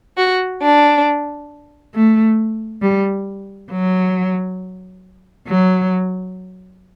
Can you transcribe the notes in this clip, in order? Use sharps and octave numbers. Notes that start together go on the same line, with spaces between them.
F#4
D4
A3
G3
F#3
F#3